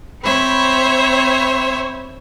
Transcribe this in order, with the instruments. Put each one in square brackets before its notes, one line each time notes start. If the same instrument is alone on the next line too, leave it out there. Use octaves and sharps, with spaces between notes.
[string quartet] C4 C5 C#5 E5 B5